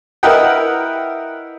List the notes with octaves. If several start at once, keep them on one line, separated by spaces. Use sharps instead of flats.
E4 A#4 B4 D#5 F#5 G5